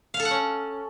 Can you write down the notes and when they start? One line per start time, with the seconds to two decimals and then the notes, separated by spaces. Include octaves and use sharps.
0.14 F5
0.19 A4
0.25 F#5
0.31 C#4